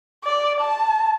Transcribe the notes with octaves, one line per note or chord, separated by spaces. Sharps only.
D5
A5